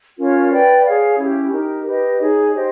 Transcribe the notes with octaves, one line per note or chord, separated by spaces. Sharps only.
C#4 F4 A#4 C#5
B4 D5 G5
G#4 C#5 F5
C#4 E4 G4
D#4 G4 A#4
G4 B4 D#5
D#4 G#4 C#5
G4 C5 D#5